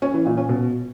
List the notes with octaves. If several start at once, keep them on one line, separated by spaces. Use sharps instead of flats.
C#4
E3
A#2
C#4
B2